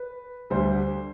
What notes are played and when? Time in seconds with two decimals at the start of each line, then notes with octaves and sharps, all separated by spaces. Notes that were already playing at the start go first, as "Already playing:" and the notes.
Already playing: B4
0.50 D2 D3 G3 C5